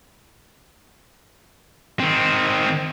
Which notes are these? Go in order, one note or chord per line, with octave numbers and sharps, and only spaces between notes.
D#3 C4